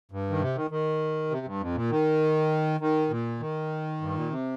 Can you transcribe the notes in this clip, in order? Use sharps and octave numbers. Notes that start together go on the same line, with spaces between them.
G2
D#3
C3
D#3
D#3
C3
G2
F2
A#2
D#3
D#3
A#2
D#3
G2
A#2
C3